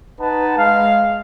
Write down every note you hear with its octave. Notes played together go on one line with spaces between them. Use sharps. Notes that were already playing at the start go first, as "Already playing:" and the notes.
D#4 B4 F#5 A5
G#3 F5